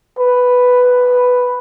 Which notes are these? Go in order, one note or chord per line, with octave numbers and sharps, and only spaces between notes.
B4